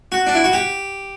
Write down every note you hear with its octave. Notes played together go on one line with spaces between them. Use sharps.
F#4
D4
E4
F#4
G4